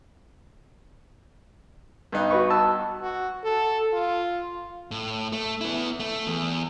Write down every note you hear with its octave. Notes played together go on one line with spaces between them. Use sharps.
G2 B3 D#4
F#4 B4 C#6
A5 E6
F#4
A4
F4
A2
A3
B3 E4
A3
E2